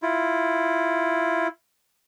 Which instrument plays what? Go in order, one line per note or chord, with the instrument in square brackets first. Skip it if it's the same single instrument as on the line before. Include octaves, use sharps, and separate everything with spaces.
[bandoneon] E4 F4